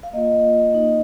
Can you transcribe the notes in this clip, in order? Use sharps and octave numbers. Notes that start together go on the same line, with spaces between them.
F5
A#3 F4 D#5
A#3 D#4